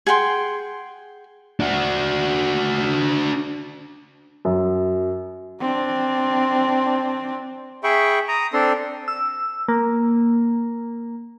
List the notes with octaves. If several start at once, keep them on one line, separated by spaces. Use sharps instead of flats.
G#4 F#5 G5 C6
D4 F#4
F#2
C4 D4
G#4 E5 G5 B5 C#6
A#5 D#6
C4 D4 A4 C6
E6
A#3